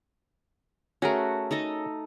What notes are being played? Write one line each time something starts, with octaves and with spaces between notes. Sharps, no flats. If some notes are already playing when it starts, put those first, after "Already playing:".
A3 C#4 F#4 G#4 A#4
D#4 A4 D#5